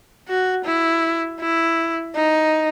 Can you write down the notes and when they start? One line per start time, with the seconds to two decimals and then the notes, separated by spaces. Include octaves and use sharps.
0.28 F#4
0.65 E4
1.40 E4
2.15 D#4